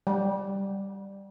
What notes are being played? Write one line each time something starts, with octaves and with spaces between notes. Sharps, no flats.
G3